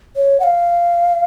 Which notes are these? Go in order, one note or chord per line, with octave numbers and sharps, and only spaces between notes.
C#5
F#5
F5